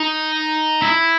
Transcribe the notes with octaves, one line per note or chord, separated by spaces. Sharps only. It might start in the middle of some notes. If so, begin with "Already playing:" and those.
Already playing: D#4
E4